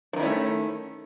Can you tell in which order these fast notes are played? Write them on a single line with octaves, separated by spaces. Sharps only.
F3 D#3 E4 C#4 A3